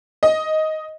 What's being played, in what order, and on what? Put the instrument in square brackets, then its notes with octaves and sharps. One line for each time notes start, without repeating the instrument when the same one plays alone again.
[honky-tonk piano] D#5